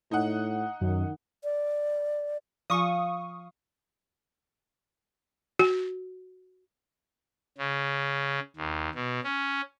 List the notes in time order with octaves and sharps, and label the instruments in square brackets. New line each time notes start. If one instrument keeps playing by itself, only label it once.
[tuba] A2 [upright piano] D#4 F#5
[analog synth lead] F#2 [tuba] D#3
[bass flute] D5
[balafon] F3 F4 G#5 [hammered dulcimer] F5 [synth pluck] C#6 D#6
[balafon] F#4
[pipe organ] C#3
D#2
B2
C#4